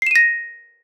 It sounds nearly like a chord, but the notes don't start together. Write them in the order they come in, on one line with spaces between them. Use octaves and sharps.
C7 E7 D#7 A#6